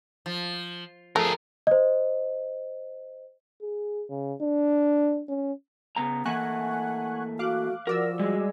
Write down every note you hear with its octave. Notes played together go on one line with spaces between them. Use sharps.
F3
F3 A3 G#4 A#4
C5 D#5
G#4
C#3
D4
C#4
C#3 B3 A#5
E3 A3 A#3 F#5 G#5 C#6 F#6
F#4 F5 D6 F#6
F3 F#4 A#4 D5 E6
G3 G#3